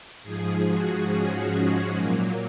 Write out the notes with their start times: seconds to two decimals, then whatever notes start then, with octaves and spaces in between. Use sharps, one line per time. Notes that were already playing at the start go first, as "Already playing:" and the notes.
0.23 G#2 F3 G#4
0.66 F#4
1.10 C#4
1.54 G#3
1.96 A#2 F#3 A#3